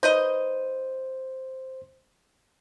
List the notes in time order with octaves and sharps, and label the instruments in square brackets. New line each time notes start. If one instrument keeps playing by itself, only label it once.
[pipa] D#4 B4 D#5 [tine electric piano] C5